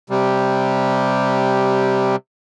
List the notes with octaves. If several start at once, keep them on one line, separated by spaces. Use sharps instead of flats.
C3 G3